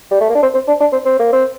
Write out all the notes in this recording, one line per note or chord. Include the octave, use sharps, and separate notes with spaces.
G3
A3
A#3
D4
C4
C4
D4
D4
C4
C4
A#3
C4